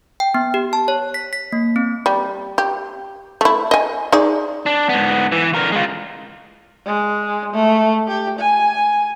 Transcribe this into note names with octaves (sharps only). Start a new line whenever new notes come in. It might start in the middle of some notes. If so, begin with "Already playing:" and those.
G5
B3
G4
A5
C#5
B6
B6
A#3
C4
G3
G4
A3 E4
D#5 G#5
D#4 G#4 D5
D4
G#2 B3
E3
D3 A#4
G#3 F4
G#3
A3
G4
G#5